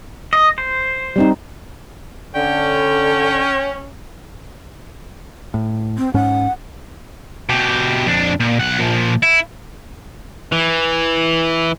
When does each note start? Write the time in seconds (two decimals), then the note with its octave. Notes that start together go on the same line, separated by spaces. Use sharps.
0.33 D#5
0.58 C5
1.16 G3 C4 D#4
2.35 D3 C#4 G5
5.54 A2
5.98 C4
6.14 G#2 C#4 F#5
7.49 B2 G4
8.06 F2 D4
8.40 A#2
8.60 B1 F#5
8.79 A#2 F3
9.23 E4
10.52 E3